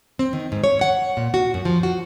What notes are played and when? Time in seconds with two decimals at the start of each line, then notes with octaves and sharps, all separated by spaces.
0.19 C4
0.33 D#3
0.52 G#2
0.64 C#5
0.81 F#5
1.17 A#2
1.34 F#4
1.54 F#2
1.65 F3
1.83 F#4